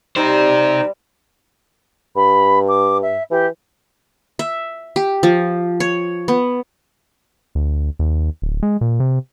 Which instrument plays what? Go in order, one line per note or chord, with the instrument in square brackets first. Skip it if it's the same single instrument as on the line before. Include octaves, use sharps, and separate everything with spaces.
[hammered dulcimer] G3 [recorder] D#4 [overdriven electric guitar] G4 C5
[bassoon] G2 [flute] B5
[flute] D6
E5
[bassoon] E3 [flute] G4
[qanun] E5
G4
F3
C#5
B3
[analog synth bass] D2
D#2
D1
G#3
A#2
C3